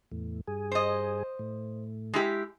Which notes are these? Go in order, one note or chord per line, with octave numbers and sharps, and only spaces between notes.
E2 A2
G2 G#4
C5 D#5
A2
G#3 E4 G4